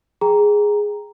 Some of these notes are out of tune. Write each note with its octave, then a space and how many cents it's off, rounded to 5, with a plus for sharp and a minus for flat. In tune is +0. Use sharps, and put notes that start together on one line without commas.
G#4 +0 G5 +10 A#5 +0